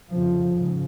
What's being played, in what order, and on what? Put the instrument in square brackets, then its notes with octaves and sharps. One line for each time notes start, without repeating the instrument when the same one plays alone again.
[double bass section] F2 C#3 F3
G#2 C#3